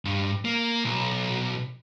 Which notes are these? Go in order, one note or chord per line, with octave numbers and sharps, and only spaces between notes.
G2
A#3
B1